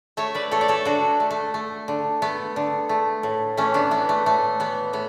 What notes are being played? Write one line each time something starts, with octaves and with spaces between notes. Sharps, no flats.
A3 C#5 E5
B4 D5
A3 A4 C#5
D5
A4 C#5
D3 D4 F#4
A3
A3
A3
D3
A3 B3
D3
A3
A2
E3 A3 C#4
B3 D4
E3 B3
A3
A2 A3
E3 B3
A2 B3